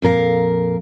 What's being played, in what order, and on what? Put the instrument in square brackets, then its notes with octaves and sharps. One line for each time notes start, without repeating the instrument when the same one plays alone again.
[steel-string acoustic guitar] F2 A#2 A#4 F5